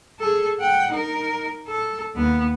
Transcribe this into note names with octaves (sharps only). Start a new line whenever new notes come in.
G#4 A4
F#5 G5
D#4 A#4
A4
D#2 B3